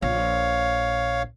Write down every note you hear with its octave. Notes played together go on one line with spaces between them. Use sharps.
A#1 C#5 F5